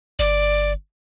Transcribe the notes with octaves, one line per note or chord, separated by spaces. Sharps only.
G1 D5